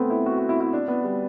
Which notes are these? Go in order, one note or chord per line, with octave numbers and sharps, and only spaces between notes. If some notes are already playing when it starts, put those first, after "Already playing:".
Already playing: A3 B3 C4
E4
F#4
F#4
E4
E4
D4
B3
G3